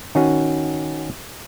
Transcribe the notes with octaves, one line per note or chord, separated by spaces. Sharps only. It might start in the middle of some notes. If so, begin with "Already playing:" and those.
D#3 C#4 F#4